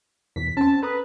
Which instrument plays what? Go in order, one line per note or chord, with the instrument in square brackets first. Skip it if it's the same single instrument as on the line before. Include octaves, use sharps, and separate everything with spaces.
[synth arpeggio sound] E2 B2 [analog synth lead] B6
[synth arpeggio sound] C4 C#4 [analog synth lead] A5
[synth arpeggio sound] A4 A#5 D#6 [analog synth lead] B4